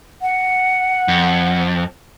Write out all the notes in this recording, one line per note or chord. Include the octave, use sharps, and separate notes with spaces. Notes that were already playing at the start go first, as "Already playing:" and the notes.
F#5
F2